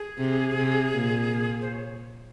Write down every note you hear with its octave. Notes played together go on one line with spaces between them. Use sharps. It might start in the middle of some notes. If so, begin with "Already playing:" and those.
Already playing: G#4
C3
C3
A#2
C5
C#5